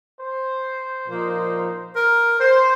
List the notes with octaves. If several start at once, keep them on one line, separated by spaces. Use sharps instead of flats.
C5
A#2 F3 A#3 D#4
A#4
C5